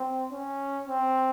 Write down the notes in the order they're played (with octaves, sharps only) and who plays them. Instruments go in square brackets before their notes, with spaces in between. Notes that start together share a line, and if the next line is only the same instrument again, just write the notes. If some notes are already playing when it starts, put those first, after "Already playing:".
Already playing: [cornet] C4
C#4
C4